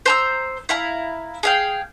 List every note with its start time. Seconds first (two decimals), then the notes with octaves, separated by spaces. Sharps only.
0.06 C5 A#5 E6
0.69 E4 F5 A#5
1.43 G#4 F5 G5